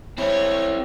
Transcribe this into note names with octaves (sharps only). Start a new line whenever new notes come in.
C4 E4 C#5